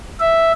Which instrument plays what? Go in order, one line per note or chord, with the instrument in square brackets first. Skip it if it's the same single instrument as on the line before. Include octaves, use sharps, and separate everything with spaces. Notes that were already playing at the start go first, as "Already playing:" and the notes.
[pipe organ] E5